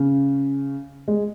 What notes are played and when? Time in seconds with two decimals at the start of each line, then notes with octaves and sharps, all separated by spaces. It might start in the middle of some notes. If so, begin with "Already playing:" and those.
Already playing: C#3
1.08 G#3